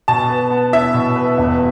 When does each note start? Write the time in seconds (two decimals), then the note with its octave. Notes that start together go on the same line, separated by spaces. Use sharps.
0.08 B2 A5
0.29 B4
0.50 B3
0.73 E4 E5
0.94 B2
1.16 B4
1.38 E1